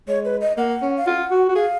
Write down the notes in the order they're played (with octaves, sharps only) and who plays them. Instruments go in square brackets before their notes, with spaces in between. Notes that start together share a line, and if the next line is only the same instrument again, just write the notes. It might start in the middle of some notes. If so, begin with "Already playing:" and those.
[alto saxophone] G#3 [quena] C#5
[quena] B4
D#5
[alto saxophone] A#3 [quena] F#5
[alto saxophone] C#4
[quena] F5
[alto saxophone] F4 [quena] F#5
[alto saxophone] F#4
F#4
[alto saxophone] G#4 [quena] F5